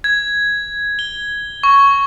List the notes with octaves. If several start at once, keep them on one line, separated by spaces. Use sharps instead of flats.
G#6
G7
C#6